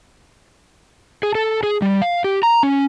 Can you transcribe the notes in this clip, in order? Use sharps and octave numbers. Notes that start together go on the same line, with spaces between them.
G#4
A4
G#4
G3
F5
G4
A#5
C#4